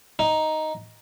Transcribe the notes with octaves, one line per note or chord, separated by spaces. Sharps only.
D#4